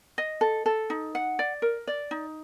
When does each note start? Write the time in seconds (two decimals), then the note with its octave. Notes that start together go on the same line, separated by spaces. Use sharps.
0.18 D#5
0.41 A4
0.66 A4
0.90 D#4
1.15 F#5
1.39 D5
1.62 A#4
1.87 D5
2.11 D#4